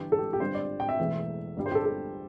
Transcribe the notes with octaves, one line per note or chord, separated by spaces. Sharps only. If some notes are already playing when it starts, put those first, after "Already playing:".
Already playing: G1 G2 E3 G4
A4
G4
G4
G1 G2 G3 C5
D5
G5
E5
E1 E2 E3 A3
G1 G2 G3
C5
G4
A4
A4